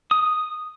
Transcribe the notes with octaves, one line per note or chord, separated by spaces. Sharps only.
D#6